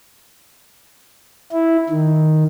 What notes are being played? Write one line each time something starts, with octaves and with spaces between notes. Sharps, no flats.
E4
D#3